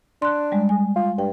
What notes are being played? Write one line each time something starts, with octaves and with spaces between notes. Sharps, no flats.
D4 C6 F#6
G3 G#3
G#5
F4
G2 G5